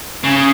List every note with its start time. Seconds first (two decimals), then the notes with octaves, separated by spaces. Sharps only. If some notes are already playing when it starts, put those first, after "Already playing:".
0.24 C#3